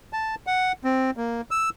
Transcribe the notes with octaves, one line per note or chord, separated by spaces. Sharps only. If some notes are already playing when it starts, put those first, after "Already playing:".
A5
F#5
C4
A#3
E6